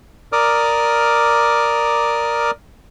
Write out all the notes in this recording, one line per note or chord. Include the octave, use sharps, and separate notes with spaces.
A#4 D5 D6 D#6 F6